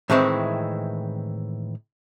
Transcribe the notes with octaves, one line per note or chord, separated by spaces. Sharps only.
A2 D#3 E3 G#3 C4 E4